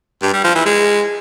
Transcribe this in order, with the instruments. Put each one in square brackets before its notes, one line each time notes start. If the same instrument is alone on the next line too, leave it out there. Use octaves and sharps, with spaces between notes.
[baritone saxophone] G2
G3
F3
E3
G#3